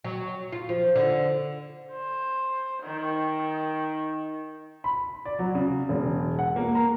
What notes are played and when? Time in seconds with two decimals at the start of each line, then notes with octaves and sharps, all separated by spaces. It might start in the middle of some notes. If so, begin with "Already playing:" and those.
0.04 F#3
0.52 F4
0.69 F3
0.95 D3
1.92 C5
2.83 D#3
4.84 B5
5.25 D5
5.39 F#3
5.55 C#3
5.89 E1
6.39 F#5
6.56 A#3
6.75 A#5